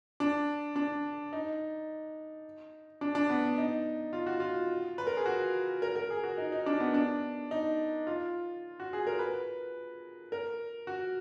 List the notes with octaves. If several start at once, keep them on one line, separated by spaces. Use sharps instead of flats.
D4
D4
D#4
D4
D4
B3
D#4
F4
F#4
F4
B4
A#4
G#4
F#4
A#4
A#4
G#4
F#4
D#4
D#4
D4
B3
D4
D#4
F4
F#4
G#4
A#4
B4
A#4
F#4